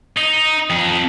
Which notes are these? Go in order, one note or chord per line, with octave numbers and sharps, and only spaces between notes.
D#4
F2